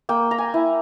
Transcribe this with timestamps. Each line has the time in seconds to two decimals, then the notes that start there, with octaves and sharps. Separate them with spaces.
0.09 A#3 G5
0.31 A#5
0.38 G#5
0.54 E4